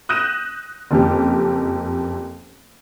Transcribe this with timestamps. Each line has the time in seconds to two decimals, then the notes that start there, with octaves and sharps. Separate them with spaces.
0.09 D#6 F#6 G6 A#6 D#7 E7
0.91 F#1 F2 G4